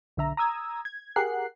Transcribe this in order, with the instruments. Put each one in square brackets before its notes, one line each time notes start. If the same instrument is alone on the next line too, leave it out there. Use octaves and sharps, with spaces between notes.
[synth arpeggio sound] B1 D3 E5 A#5
A#5 D#6 E6 G#6
G#6
G4 G#4 A#4 F#5 F#6 C7